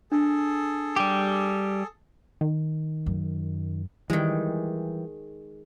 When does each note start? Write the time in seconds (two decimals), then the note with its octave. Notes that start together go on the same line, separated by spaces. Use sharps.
0.12 D4 G#4 A4
0.96 G3 G4
2.41 D#3
3.06 F#2
4.10 D#3 E3 G3 G#3